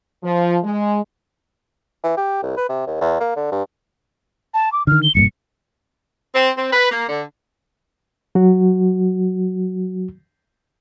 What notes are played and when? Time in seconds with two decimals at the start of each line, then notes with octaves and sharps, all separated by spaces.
0.24 F3
0.64 G#3
2.03 E3
2.17 G4
2.42 C2
2.57 B4
2.69 C3
2.86 D#2
3.01 E2
3.20 A#3
3.36 D3
3.52 G2
4.54 A5
4.73 D6
4.87 D3 D#3 F6
5.03 G7
5.15 E1 G2 A#2 C#7
6.34 C4
6.56 C4
6.73 B4
6.91 A#3
7.08 D3
8.35 F#3 F#4